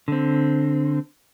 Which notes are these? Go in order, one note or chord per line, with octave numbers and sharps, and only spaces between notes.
D3 C4